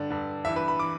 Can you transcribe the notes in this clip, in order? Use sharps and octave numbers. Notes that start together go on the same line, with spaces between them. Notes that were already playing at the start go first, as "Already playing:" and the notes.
Already playing: G2 D3 D5
G2 D3
G2 E3 E5
B4
B5
E3 D6